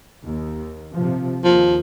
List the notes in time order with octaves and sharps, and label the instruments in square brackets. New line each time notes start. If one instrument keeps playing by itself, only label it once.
[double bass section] D#2
C3 F3
[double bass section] D#2 [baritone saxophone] F3